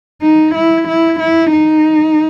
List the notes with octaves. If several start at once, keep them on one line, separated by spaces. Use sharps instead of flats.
D#4
E4
E4
E4
D#4